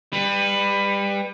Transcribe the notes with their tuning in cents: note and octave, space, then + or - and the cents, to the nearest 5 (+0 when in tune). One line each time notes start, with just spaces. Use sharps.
G3 +25 B4 +10